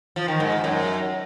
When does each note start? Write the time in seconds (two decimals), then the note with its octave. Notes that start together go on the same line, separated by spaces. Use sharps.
0.16 F3
0.28 D#3
0.40 G#2
0.52 G#2
0.64 F#2